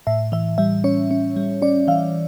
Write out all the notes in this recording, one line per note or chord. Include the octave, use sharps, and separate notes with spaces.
A2 E5
E3 E5
G3 E5
C#4 C#5
C#4
G3
C#4 D5
E3 F5